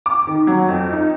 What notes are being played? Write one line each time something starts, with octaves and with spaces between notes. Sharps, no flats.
D6
D#3
F#3
F2
D#4